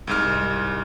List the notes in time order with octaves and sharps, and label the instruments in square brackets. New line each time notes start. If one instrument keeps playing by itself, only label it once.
[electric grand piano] C2 G#2 F6